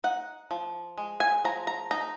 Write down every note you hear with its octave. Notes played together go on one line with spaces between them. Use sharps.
D#4 F#5
F3
G#3
G#5
F3 A#5
A#5
D#4 A#5